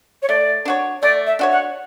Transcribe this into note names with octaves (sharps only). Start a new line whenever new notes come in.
C#5
A3 D5
D4 F#4 C#5
A3 D5
E5
D4 F#4 C#5
F#5